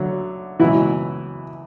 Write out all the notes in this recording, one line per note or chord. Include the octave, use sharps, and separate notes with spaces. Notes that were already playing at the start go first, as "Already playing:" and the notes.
Already playing: D2 D3 F#3
C#2 B2 E3 F#3 E4